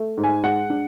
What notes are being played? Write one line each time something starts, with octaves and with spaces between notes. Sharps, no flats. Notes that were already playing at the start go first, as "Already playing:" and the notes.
Already playing: A3
G#2
G#5
G#3 F#5
D4